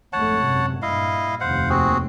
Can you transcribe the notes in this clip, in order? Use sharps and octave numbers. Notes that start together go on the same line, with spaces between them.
G#1 F2 A3 C#5 F#5 A5
F#2 C3
G2 A#2 E4 D#5 F5
F1 D#2 C5 F5 F#5
C4 F#4 G#4